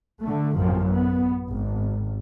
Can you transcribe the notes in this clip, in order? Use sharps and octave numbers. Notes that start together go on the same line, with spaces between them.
D3 A3
A1 F#2 F3
B3
G#1